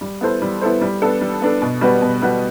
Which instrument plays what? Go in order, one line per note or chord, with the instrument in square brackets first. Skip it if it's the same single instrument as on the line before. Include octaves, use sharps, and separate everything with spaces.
[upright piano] G3
B3 E4 A4 C5
G3
B3 E4 A4 C5
G3
B3 D4 A4
G3
B3 D4 A4
B2
G3 B3 F#4 B4
B2
G3 B3 F#4 B4